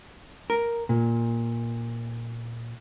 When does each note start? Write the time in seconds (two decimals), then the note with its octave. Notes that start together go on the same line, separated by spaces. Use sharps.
0.50 A#4
0.89 A#2